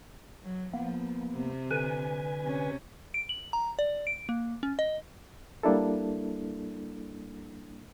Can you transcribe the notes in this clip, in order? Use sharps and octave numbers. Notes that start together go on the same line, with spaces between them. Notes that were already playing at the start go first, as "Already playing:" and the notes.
F#3
F3 A#3 B3
C3
D3 B4 G#5
C3 C#4
D7
F#7
A#5
D5
D7
A#3
C#4
D#5
G3 A#3 D4 E4 A4